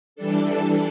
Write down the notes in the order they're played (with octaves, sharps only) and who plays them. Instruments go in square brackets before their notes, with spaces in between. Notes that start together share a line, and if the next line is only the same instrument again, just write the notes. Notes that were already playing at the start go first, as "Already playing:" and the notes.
[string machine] E3 G3 D4 A4